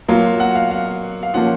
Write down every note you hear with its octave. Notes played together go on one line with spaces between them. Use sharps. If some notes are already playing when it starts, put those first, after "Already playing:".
F#3 A#3 F4
F#5
F5
F5
F5
F3 A#3 C#4 F4 F#5